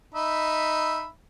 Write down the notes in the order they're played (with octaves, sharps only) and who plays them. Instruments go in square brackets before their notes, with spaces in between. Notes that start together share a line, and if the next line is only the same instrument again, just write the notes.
[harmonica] D#4 E5 B5